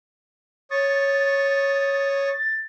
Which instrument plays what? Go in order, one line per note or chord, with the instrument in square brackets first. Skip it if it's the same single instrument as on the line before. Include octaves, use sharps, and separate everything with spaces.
[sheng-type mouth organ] C#5 C#6 D#6 [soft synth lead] A6